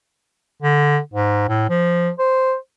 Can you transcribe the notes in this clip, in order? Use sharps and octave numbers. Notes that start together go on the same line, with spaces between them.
D3
G#2
A2
F3
C5